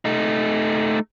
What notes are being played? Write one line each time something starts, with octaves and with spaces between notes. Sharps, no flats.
A3 D#4